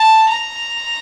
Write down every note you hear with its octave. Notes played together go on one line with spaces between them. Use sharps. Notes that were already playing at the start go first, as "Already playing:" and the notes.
Already playing: A5
A#5